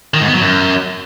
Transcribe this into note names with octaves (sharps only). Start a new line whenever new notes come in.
D#3
G#2
B3
F#3
F#2